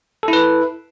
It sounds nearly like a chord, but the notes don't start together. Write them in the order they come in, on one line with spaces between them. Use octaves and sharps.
A4 E4 B4